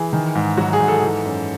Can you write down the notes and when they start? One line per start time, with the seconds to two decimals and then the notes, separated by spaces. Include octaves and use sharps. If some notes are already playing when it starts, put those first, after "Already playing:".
Already playing: E3 G#4
0.13 D#3
0.35 G#2
0.57 F#3 F#4
0.73 G#4
0.80 G#2
0.88 A4
1.02 E3
1.25 F#2